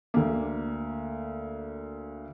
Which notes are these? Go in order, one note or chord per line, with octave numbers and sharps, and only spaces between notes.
D2 A#3